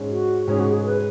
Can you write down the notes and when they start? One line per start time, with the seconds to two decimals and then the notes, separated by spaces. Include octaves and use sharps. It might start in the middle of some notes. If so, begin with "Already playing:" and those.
Already playing: G#2 G#3 C#4
0.09 F#4
0.47 G#2 G#3 C#4 G#4
0.60 F#4
0.72 G#4
0.86 B4